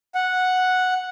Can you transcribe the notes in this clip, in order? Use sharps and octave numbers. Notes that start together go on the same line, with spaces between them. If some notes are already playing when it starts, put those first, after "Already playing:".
F#5